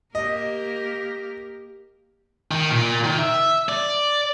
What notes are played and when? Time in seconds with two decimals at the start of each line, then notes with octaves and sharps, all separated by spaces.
0.15 A#3 G4 A#4 D#5
2.52 D#3
2.71 A#2
3.04 D#3
3.19 E5
3.69 D5